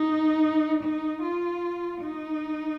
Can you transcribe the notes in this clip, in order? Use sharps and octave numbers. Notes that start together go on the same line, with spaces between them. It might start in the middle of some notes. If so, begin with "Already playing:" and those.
Already playing: D#4
D#4
F4
D#4